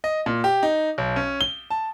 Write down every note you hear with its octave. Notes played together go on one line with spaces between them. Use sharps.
D#5
A#2
G4
D#4
B1
C#4
G7
A5